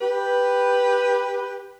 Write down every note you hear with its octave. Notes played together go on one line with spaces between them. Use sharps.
G4 B4